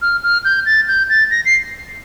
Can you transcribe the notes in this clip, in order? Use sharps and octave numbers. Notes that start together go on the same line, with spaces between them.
F6
F6
G6
A6
G6
A6
A#6
C7